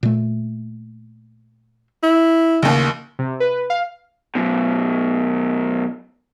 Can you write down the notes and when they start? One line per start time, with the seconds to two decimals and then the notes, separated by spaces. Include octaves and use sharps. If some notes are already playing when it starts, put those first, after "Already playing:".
0.03 A#2 A3
2.03 E4
2.62 A1 D#2 C#3
3.19 C3
3.40 B4
3.70 F5
4.35 F#2 B2